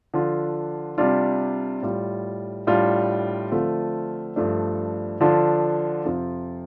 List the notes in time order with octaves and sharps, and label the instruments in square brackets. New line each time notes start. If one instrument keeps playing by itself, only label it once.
[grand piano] D3 F3 D4 F4
C3 G3 D4 F4
A2 G3 F4
A2 G3 D4 F4
D3 F3 A3 C4 F4
G2 F3 A3 D4
D3 F3 D4 F4
F2 C3 F3 C4 F4